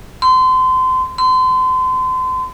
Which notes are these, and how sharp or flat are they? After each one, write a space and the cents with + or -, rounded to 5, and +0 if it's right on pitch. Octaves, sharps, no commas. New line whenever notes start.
C6 -30
C6 -35